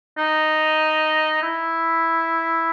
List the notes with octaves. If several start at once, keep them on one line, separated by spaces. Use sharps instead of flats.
D#4
E4